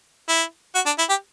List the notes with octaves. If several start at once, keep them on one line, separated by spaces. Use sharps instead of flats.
E4
F#4
D4
E4
G4